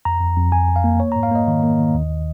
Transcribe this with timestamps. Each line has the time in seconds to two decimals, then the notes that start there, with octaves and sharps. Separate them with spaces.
0.05 F2 A#5
0.21 F2
0.36 F2
0.52 F2 G#5
0.68 F2
0.76 F5
0.84 A#3
1.00 A#3 C#5
1.12 G#2 A#5
1.23 F5
1.31 A#3 D#5
1.48 D#3
1.63 A#3
1.79 D#3
1.94 D#2